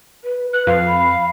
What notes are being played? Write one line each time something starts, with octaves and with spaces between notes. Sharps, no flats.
B4
B4 F#6
F2 F5
B5